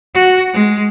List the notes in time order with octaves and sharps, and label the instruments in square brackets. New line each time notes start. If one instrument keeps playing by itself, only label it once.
[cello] F#4
G#3